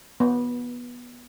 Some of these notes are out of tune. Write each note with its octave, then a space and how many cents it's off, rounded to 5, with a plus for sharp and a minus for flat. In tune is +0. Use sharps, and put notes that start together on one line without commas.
B3 -15